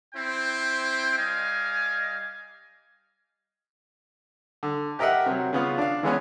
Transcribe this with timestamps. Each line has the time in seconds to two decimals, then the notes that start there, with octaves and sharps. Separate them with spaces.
0.14 C4 E4 C5 G5
1.18 G3 D#5 F5 G#5
4.63 D3
4.99 G4 A#4 D#5 E5 F#5
5.26 C3 F#3
5.53 C#3 B3 F4
5.78 D4 F5
6.03 E3 G#3 B3 C#4